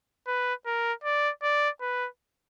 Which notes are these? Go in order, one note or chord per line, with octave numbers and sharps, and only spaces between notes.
B4
A#4
D5
D5
B4